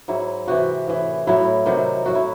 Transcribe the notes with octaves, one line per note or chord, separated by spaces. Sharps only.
G#2 F#3 E4
C3 E3 F#4
A2 E3
A2 F#3 E4
C3 D#3 F#3
A2 F#3 F#4
E4